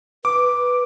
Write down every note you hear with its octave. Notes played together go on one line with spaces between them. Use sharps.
B4 D6